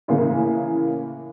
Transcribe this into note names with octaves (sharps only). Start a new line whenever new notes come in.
A2 C#3 E3 A#3